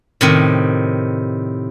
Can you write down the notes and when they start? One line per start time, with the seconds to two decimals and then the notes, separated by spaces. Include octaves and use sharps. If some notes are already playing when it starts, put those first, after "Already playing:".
0.21 A2 C3 D#3